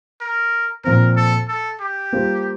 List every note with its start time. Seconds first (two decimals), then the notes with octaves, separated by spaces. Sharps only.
0.21 A#4
0.84 A#2 F3 C4 A#4
1.17 A4
1.48 A4
1.80 G4
2.12 G3 A#3 F4 C5